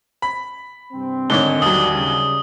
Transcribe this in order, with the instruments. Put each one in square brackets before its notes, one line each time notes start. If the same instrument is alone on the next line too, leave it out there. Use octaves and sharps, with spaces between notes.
[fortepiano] B5
[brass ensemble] G2 C3 C4
[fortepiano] G#2 D3 D#3 [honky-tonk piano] A4 C#5 [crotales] G7
[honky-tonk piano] D#2 F#3 [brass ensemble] G3 [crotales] D#6
[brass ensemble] C#3 G3